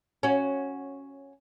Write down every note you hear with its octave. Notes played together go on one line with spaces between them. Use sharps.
C#4 F#4